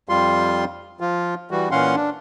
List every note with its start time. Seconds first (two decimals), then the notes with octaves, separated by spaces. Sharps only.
0.09 F2 G3 F4 C6
1.00 F3 F4
1.51 E3 G3 F#4
1.71 A#2 E3 C#4 F5 F#5 C6
1.95 D4